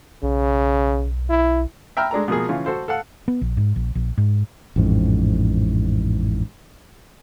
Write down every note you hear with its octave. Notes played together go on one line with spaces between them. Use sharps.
B1 C#3
E4
E5 G5 A#5 B5 F6
G#3 D4 A4 A#5
B2 F3 A#3 G#4
C#3 E3 F4
F#4 A4 C5
A4 F5 F#5
B3
A#1
G#2
A#1
A#1
G#2
A1 F2 G#2